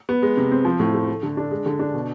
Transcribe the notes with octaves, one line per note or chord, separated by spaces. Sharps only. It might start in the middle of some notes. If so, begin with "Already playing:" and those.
B3
G#3
C3
C4
F3
A2
A3
A3
D3
D4
G#3
D3
D4
B2